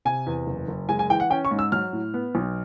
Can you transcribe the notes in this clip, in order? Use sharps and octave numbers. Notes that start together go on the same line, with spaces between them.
C3 G#5
E2
F#1
F#1
G#3 G#5
G#5
E3 G5
F#5
C#4 G5
C#6
G#2
E6
F#3 F6
A2
B3
B1